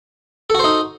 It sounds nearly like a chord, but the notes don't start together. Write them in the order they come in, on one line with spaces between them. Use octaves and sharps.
A4 F#4 C5 D#4